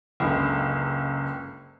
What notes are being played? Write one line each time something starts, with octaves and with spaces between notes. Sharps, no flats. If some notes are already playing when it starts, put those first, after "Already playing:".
F#1 C#2 D3